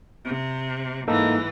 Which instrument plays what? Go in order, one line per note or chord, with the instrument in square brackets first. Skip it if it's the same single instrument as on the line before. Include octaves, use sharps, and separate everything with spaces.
[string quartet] C3
[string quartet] G#2 E3 [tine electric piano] A#3 D#4 A4